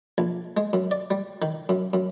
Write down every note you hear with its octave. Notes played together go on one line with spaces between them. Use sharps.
A#1
G#3
F#2
D5
G3
D#3
F#2
F#2